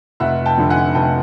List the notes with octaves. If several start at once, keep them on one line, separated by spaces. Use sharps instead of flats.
F1 E5 F#5
G5 A5
F2 D3
F#5 G#5
F1 G5 A5